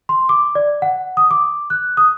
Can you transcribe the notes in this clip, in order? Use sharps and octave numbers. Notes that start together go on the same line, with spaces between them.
C6
D6
D5
F#5
D#6
D6
F#6
D#6